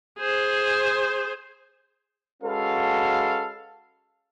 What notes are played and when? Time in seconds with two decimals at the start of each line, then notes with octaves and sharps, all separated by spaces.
0.19 G#4 C5
2.43 G#3 C#4 F#4 A4 B4 F5